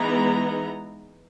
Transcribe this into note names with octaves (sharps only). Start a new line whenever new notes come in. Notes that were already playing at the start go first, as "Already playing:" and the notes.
Already playing: E3 G#3 B3 D#4 A#5